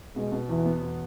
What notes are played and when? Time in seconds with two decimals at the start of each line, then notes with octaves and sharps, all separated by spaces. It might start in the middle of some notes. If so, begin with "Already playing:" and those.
0.16 B2 G#3
0.32 B2
0.49 E2 E3
0.66 B3
0.81 E2